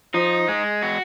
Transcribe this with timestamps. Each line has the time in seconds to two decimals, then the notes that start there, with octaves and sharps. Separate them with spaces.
0.14 F3 D#4
0.49 G#3
0.83 F#4